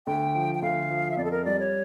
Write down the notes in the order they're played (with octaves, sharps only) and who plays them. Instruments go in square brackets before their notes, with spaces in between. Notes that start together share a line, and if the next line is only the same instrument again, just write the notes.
[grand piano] D2 [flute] G5
[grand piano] F3
[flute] G5
[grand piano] D2 [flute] F5
[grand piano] F3
[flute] E5
[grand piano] F2 [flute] D5
[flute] A4
A#4
[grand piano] G3 [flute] D5
[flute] C#5